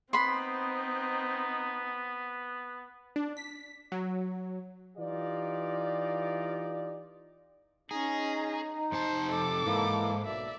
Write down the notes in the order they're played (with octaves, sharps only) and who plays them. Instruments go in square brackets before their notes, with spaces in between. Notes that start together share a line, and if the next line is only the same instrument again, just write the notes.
[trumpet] B3 [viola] C4 [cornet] D#4 [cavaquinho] B5 C6
[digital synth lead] D4
B6
F#3
[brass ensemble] E3 D#4 F4 G4 D5
[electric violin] C#4 A#5 [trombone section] D#4 [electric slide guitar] G#4
[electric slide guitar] F2 C3 A5 [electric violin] C5
[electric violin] A4 D6
[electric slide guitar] G#2 [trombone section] E3 A#3 E4
[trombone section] B1 [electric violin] D5 E5